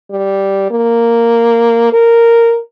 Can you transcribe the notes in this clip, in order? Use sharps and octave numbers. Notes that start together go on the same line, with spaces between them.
G3
A#3
A#4